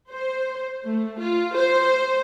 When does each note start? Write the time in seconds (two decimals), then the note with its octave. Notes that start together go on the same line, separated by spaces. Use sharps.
0.11 C5
0.85 A3
1.20 F4
1.55 C5